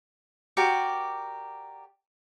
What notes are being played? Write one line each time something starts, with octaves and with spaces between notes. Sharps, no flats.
F#4 G4 A#4 D5